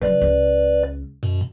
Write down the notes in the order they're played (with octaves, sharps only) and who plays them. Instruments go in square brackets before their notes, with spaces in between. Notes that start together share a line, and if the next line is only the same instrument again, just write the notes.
[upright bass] C#3 F#3 [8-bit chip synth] B4 D5
[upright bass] C#2
[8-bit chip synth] F#2 B2